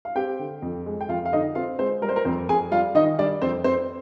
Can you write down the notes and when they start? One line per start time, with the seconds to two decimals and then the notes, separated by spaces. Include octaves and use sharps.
0.05 F5
0.15 C4 G4 G5
0.39 D3
0.62 F2
0.86 G#3
1.01 G5
1.08 F2 F4 F5
1.26 F5
1.32 D3 D#4 D#5
1.55 C4 F4 F5
1.79 G#3 C4 C5
2.02 G3 A#4
2.09 C5
2.16 A#4
2.25 F2 C4 C5
2.49 F2 G#4 G#5
2.71 G3 F4 F5
2.95 D#3 D#4 D#5
3.19 G3 D4 D5
3.42 F2 C4 C5
3.64 C4 C5